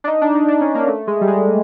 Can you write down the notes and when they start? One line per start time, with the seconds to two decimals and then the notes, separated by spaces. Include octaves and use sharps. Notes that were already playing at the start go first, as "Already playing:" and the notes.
0.04 D4
0.07 D#4
0.21 D4
0.35 D#4
0.48 D4
0.61 C#4
0.75 A#3
0.88 A3
1.07 G#3
1.21 G3
1.28 G#3